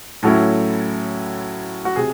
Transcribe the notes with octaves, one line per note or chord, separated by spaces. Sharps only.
A2 F#3 C#4 E4 A4
F#4
C3 G#4